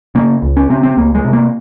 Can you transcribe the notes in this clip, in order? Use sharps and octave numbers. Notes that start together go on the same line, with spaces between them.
C#3 A#3
C#2
C#4
C#3 C4
C4
C#2 A#3
G#3
C3
A#3